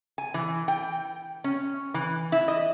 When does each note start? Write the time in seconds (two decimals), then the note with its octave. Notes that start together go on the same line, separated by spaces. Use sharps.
0.18 G#5
0.34 E3
0.68 G5
1.44 C#4
1.94 E3
2.32 E4
2.48 D#5